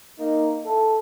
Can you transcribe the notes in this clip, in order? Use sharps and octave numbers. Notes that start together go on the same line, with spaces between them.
A#3 D#4
E4 A4